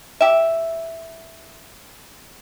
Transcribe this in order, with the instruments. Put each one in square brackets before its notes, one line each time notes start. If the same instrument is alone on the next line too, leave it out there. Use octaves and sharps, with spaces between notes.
[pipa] G4 E5